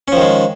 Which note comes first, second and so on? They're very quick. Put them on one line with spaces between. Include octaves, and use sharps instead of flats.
C#4 F3 D#3 G#3